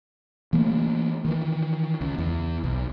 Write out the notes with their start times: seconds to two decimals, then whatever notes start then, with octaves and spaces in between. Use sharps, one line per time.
0.53 E3 A3 A#3
1.25 D#3 E3
2.01 C#2
2.18 E2
2.64 B1